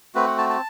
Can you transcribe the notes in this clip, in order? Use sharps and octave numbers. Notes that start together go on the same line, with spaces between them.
A3 C4 F#4 B4
F#5
A5
A5